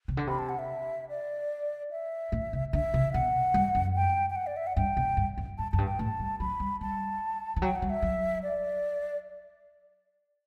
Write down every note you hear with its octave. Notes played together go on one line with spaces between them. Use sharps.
C3
D3
C3 B5
A5
F#5
E5
D5
E5
A2
C3
D3 E5
C3
B2 F#5
G2
F#2
G5
G5
F#5
D5
E5
F#5
G2 G5
B2
G2
F#2
G2 A5
F#2 A5
G2
G5
A2 A5
G3
F#3 B5
G3
G3 A5
E3
F#3 G5
F#5
G3
E5
F#3
D5